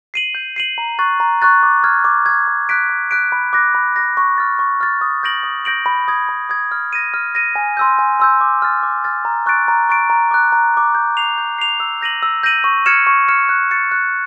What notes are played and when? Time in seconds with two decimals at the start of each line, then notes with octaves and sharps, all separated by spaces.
0.14 C7 D#7 F#7
0.35 G6
0.56 C7 D#7 F#7
0.78 A#5
0.99 C#6 F#6 A6
1.20 A#5
1.42 C#6 F#6 A6
1.63 D6
1.84 F6 G#6
2.04 D6
2.26 F6 G#6
2.48 C#6
2.69 F#6 B6 D7
2.90 C#6
3.11 F#6 B6 D7
3.32 B5
3.53 D6 F#6 A#6
3.75 B5
3.96 D6 F#6 A#6
4.17 C#6
4.38 F6 A6
4.59 C#6
4.81 F6 A6
5.01 D#6
5.23 G6 A#6 D7 F#7
5.43 D#6
5.65 G6 A#6 D7 F#7
5.86 B5
6.08 D#6 G#6
6.29 B5
6.50 D#6 G#6
6.72 F6
6.93 A#6 D#7
7.14 F6
7.35 A#6 D#7
7.55 G#5
7.77 C6 E6 G6
7.99 G#5
8.20 C6 E6 G6
8.41 D6
8.62 F6 A6
8.83 D6
9.04 F6 A6
9.25 A#5
9.46 C#6 F#6 A6 D7
9.68 A#5
9.89 C#6 F#6 A6 D7
10.10 A#5
10.31 D6 F#6
10.52 A#5
10.74 D6 F#6
10.95 G6
11.17 C7 F7
11.38 G6
11.58 C7 F7
11.80 E6
12.01 G6 A#6 D#7 F#7
12.23 E6
12.43 G6 A#6 D#7 F#7
12.64 C#6
12.86 F6 G#6 C#7 E7
13.07 C#6
13.28 F6 G#6 C#7 E7
13.49 F#6
13.71 A6 C#7
13.92 F#6